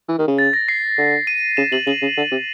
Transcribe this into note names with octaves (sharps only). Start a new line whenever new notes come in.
E3
D#3
C#3
A6
A#6
C7
D3
D#7
C#3 E7
C3 F#7
C#3 F#7
C#3
D3
C3